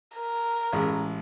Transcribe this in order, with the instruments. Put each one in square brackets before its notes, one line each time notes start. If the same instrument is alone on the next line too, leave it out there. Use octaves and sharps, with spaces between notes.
[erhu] A#4
[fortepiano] A1 G#3 B5